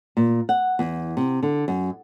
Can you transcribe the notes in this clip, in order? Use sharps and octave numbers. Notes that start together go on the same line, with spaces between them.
A#2
F#5
E2
C3
D3
F#2